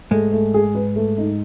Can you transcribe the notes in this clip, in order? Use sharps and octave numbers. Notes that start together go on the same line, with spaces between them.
G#2 G#3 A3
A3
G#4
B4
A3
D#4